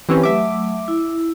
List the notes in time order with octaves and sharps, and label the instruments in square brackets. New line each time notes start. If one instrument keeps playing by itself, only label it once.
[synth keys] E3 C4 C#4 [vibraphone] G4 B4
[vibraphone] F#3 A3 [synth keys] E5 D6
[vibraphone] E4